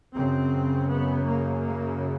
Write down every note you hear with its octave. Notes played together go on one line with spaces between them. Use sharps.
F#2 C#3 C4
B3
A#3
A#3